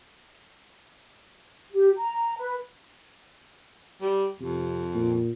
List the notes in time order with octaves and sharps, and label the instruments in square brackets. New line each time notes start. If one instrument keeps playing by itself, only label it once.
[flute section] G4
A#5
B4
[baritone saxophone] G3
[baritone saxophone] F2 [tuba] C3
[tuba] A#2